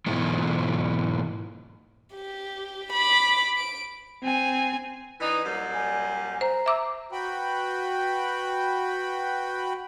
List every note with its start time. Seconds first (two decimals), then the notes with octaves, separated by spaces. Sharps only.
0.06 G#2 B2 E3 G#3
2.14 G4
2.92 B5 D6
3.57 D7
4.23 C4 G#5
5.20 E3 D4 D#4
5.43 F#2 A#2 G3
5.74 G#5
6.41 C5 A#5
6.66 E5 D6 E6
7.12 F#4 B4 G5 B5